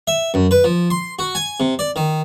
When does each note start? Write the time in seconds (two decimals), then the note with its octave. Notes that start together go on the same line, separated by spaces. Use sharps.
0.07 E5
0.34 F#2
0.51 B4
0.64 F3
0.90 C6
1.19 F#4
1.35 G#5
1.60 C3
1.79 D5
1.96 D#3